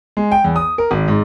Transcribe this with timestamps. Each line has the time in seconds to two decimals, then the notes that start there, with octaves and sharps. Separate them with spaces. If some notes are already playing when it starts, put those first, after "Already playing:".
0.17 G#3
0.32 G5
0.44 E2
0.56 D#6
0.78 A#4
0.91 G#1
1.08 G#2